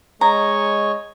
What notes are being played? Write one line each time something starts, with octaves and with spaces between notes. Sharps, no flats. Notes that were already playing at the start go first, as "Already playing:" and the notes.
G#3 C#5 D#5 A#5 C#6